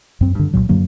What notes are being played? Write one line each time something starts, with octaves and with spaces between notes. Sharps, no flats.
F#2 C4
G2 D3
C2 F#2 A#2 F#3
F#2 D3 F#3 A#3